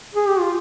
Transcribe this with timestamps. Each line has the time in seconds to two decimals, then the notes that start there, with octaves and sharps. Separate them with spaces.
0.15 G#4
0.28 G4
0.39 F4